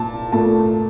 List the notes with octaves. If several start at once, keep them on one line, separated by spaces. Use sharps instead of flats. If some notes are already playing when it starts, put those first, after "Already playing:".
Already playing: A#2 A5
A#2 A3 A5